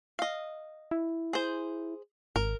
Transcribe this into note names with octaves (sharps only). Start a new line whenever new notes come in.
D#5 F5
E4
G#4 C5
G#1 A#4